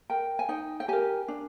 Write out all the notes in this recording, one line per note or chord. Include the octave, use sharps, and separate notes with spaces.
A#4 G5
G#5
D#4 G5
G5
G4 A#4 G#5
D4